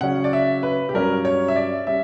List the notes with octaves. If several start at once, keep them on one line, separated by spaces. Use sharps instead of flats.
C#3 F#3 C#4 F#5
D5
E5
B4
G4
G2 F#3 C#4 A#4
C#5
E5
D5
G3 C#4 E5